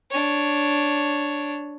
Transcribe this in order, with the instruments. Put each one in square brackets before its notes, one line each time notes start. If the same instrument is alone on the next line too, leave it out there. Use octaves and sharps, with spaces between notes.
[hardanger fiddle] D4 C#5